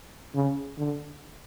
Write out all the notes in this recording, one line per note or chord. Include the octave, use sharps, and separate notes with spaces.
C#3
D3